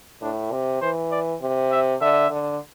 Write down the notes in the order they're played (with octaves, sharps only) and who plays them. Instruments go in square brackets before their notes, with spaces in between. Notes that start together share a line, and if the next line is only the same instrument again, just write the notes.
[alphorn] A2 [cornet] D4
[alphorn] C3
[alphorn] E3 [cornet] C5
[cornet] D5
[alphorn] C3
[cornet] E5
[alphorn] D3 [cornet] E5
[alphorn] D3